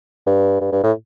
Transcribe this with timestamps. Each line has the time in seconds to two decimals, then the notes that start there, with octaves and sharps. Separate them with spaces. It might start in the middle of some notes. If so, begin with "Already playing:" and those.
0.27 G2
0.61 G2
0.73 G2
0.84 A2